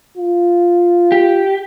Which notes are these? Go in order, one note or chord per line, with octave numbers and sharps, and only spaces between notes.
F4
G4